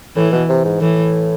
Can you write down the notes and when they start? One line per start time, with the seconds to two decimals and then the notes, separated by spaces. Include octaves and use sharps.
0.16 A2 E3
0.32 B2
0.49 C3
0.65 G#2
0.81 A2 E3